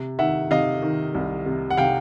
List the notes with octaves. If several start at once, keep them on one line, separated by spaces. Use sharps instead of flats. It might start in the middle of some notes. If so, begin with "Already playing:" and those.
Already playing: C3
D#3 E5 F#5
C3 D#5 F5
D#3
C2
C3
F#5
C3 F5 G5